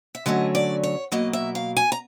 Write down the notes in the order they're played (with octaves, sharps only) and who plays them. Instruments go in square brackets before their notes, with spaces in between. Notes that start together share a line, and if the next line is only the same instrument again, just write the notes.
[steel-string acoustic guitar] E5
D3 F#3 A3 C#4 D#5
D5
C#5
B2 F#3 A#3 D#5
E5
F5
G#5
A#5